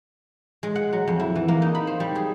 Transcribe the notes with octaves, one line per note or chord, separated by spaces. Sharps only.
G#3
F#5
F#3
F2
E4
E3
A#3
D#4
B5
C5
G3
G#4